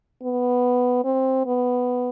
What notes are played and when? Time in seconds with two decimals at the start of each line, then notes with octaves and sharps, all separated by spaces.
0.23 B3
1.05 C4
1.46 B3